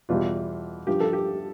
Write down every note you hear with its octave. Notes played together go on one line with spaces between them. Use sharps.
E2 B2 G3 F4
G2 F3 G4
A4
G4